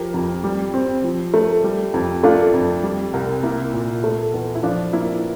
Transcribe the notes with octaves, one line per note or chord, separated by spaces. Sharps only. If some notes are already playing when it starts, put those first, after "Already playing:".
Already playing: F3 G4 A#4
F2
G3
C4
F3
A3
G3
F2
A3 D4 F4
F2
G3
C2
A#3 E4
A#2
A3
E2
E4
F3 D4 F4
A#3 E4